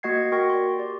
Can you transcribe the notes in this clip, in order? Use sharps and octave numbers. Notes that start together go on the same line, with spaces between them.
A#3 F#4 D#5 F#5 G#6 C7
A#3 F#4 A#4 G5 C#6 A#6
D5 C6
G4 D5